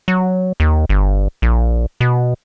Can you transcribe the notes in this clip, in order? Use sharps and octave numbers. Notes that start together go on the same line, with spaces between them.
F#3
D#2
G1
A#1
B2